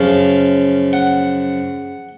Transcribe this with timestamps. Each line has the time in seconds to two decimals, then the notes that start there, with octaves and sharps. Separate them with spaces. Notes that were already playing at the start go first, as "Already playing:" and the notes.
Already playing: F#2 C#3 F3 F5
0.93 F#5